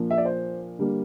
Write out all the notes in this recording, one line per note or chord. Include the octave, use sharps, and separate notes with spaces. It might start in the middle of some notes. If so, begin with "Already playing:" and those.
Already playing: A#2 F3 A#3 D4
E5
D5
C5
D3 G3 A#3